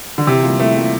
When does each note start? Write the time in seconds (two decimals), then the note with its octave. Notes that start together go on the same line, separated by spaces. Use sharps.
0.18 D3
0.27 C3 E3
0.43 G3 A#3 F4
0.59 E3 A3
0.76 G3 A#3 F4